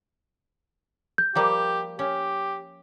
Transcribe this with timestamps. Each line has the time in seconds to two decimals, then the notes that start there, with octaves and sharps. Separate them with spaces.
1.18 G6
1.35 F3 G3 A#3 G4
1.99 C#4 G4